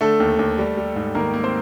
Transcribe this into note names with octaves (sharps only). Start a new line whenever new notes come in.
D3 A3 A4
D#2
D#2
G3
G3
G#2
D#3 A#3 A#4
A#3
C4 C5